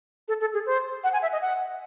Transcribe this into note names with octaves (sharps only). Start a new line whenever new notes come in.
A4
A4
G#4
C5
F#5
G#5
E5
D#5
F#5